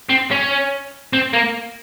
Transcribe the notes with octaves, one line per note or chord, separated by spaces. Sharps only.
C4
C#4
C4
A#3